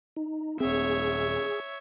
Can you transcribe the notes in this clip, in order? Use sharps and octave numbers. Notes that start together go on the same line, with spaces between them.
D#4
D#1 C4 G#4 C#5 E5